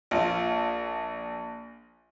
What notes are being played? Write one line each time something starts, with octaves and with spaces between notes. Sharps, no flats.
A#1 F4